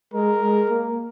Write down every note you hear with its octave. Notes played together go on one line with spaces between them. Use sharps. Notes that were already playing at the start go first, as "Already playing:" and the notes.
G#3 A#4
G#3
A#3